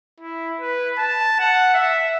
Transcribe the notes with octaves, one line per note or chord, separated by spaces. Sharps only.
E4
B4
A5
F#5
E5